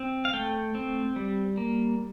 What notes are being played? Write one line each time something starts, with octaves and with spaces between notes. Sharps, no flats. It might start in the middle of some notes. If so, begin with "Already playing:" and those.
Already playing: C4
F5
A3 G5
C4
G3
A#3